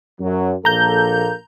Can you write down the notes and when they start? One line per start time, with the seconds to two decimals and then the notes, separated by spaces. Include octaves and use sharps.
0.20 F#2 F#3
0.65 A#1 A#3 A4 A#5 G6